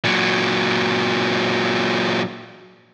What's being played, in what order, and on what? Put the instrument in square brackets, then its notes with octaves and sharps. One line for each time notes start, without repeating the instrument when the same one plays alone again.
[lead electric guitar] A#2 F#3